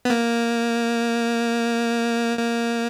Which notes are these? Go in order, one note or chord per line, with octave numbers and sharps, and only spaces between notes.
B3
A#3
A#3